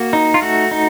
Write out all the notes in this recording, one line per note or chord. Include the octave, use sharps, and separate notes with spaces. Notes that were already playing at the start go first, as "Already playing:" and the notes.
Already playing: A#3 F#4
D#4
F4
A3 F#4
D#4